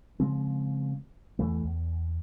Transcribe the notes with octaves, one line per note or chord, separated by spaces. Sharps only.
C#3 F3 G#3 C4
E2 E3 A3
E2